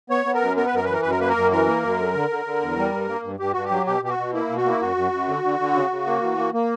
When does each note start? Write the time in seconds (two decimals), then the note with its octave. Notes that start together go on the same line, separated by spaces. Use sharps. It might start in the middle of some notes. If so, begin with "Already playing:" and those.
0.10 B3 C#5
0.26 B3
0.34 A#4
0.42 F#2
0.57 B3 A#4
0.66 B4
0.73 F#2 A#4
0.85 B4
0.88 E3 A#4
1.02 F#2 B4
1.11 A#4
1.20 A#3 B4
1.29 A#4
1.36 F#2
1.51 E3 A#4
1.67 A#3
1.83 F#2
1.99 D3
2.14 D3
2.30 D3
2.45 D3
2.61 E2
2.77 G3
2.93 G2
3.09 A#3
3.24 G2
3.39 G2 G4
3.52 G2 F#4
3.65 G4
3.71 F#3
3.86 B2 G4
4.02 B2 G4
4.10 F#4
4.18 B2
4.33 A#3 E4
4.49 B2
4.57 F#4
4.65 A#3 E4
4.81 F#2 F#4
4.96 F#2
5.12 F#2
5.28 D3
5.44 D3
5.59 D3
5.74 C#3
5.91 C#3
6.06 A#3
6.22 E3
6.38 A#3
6.54 A#3